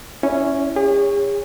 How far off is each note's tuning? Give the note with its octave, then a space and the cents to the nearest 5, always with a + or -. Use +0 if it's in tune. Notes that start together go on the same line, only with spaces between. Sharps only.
C#4 +0 E4 -5 D5 -40
G#4 -45 C#5 +0